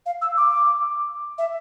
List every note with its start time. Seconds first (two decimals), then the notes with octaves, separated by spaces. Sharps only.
0.06 F5
0.22 E6
0.37 D6
1.38 E5